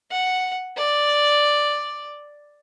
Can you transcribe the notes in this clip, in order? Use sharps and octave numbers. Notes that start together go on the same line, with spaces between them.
F#5
D5